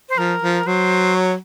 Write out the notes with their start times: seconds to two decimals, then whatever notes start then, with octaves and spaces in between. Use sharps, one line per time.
0.09 C5
0.17 F3 A#4
0.42 F3
0.66 F#3 C5
1.15 C#5